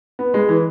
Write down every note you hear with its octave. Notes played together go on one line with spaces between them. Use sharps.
B3
G#3
E3